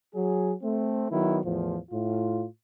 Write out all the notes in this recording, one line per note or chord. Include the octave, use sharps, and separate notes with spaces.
F#3 G#4
A3 C4
D#3 F#3 B3 E4
E2 A2 F3
A2 F4